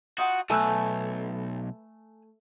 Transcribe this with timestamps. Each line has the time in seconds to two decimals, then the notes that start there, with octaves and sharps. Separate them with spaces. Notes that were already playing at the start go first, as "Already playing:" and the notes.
0.18 D#4 F4 F#4 F#5
0.50 B1 A3 B4 G#5 E6 F#6